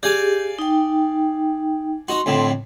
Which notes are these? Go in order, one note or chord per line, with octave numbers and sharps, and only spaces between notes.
G4 G#4 D5 F5 G#5
D#4 G5
D#4 F#4 C6
F2 A2 D3